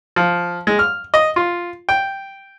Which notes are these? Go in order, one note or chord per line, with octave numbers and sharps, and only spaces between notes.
F3
G#3
F6
D#5
F4
G5